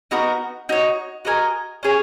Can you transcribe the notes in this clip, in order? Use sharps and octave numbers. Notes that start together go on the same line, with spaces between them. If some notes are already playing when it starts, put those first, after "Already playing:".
B3 D#4 F#4 A#4
D#4 F#4 C#5
F#4 A#4 D#5 G#5
C#4 G#4 C#5